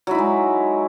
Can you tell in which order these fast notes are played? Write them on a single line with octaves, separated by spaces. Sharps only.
F#3 E4 D#4 G#3